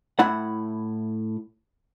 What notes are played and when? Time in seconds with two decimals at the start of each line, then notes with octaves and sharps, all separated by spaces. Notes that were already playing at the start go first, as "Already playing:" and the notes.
0.19 A2 E4 F#5